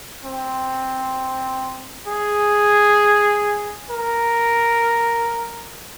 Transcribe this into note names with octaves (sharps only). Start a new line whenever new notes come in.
C4
G#4
A#4